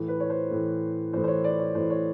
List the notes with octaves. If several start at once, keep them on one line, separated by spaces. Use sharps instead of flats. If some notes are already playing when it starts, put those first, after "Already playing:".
Already playing: A2 E3
B4
C#5
C5
A2 E3
A2 E3 C5
C5
C#5
D5
C#5
A2 E3 C5
C#5